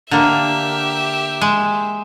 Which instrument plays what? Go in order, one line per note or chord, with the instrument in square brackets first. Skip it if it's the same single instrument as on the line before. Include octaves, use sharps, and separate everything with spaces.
[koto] D3 A#3 [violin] G4 E5
[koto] G#3